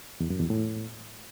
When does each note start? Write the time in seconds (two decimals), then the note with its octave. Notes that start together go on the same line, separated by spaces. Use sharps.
0.20 E2
0.30 F#2
0.40 E2
0.50 A2